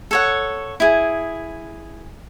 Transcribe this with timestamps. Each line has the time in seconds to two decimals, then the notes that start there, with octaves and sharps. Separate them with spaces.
0.11 A4 C#5 F#5
0.80 E4 G#4